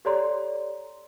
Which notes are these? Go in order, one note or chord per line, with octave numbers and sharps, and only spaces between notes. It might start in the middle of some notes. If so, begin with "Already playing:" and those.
G4 A4 C#5 D5 A#5 C6